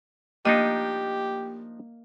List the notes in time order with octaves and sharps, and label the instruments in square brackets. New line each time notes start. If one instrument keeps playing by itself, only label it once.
[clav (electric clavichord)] F3 D4 D#4 [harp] A#3 [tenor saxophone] G4 [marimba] D#5